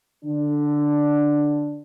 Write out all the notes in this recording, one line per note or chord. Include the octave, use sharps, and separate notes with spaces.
D3 D4